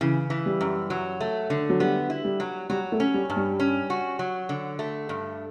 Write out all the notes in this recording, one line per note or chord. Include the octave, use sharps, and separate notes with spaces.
C#3 E3
E3
G3
F#2
F#3
A3
D3
F#3
G3 B3
E4
G3
F#3
F#3 G3
A3
C#4
G3
G2
G3
C#4
F#4
F#3
D3
A3
G2